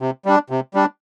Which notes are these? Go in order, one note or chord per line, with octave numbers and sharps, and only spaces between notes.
C3
G3 D4
C3
G3 D4